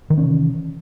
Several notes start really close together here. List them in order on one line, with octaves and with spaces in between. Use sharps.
D#3 E3 C#4 C3